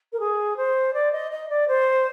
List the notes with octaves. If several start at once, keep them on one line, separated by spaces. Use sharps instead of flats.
A#4
G#4
C5
D5
D#5
D#5
D5
C5